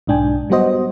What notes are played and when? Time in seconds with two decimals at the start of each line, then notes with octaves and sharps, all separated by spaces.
0.07 B1 G#2 D4 G5 G#5
0.50 F#3 G3 B3 F#4 C5 D#5